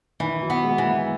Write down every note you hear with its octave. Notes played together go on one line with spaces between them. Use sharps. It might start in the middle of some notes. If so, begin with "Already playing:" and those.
D#3 E3
F#3
B3
G#3
E3
A#3